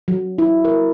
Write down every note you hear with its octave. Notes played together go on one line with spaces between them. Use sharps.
F#3
E4
A#4